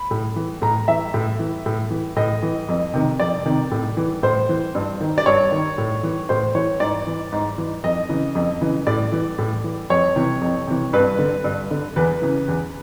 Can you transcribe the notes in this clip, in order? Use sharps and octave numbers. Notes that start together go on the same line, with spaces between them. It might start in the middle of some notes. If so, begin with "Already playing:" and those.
Already playing: B5
A2
E3
A2 A#5
E3 E5
A2
E3
A2
E3
A2 D#5
E3
F2
C3 D#3
F2 D5
C3 D#3
A2
E3
A2 C5
E3
G2
D#3
D5
G2 C#5
D#3
A2
E3
A2 C5
E3 C#5
G#2 D5
E3
G#2
E3
F2 D#5
C#3 E3
F2
C#3 E3
A2 D5
E3
A2
E3
F2 C#5
C3 E3
F2
C3 E3
G2 B4
D3
G2
D3
E2 B4
C#3 E3
E2